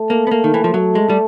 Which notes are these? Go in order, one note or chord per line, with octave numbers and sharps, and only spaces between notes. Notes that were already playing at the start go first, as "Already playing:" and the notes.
Already playing: A3
A#3
B3
A#3
D#3
E3
F3
F#3 A3
G#3
G3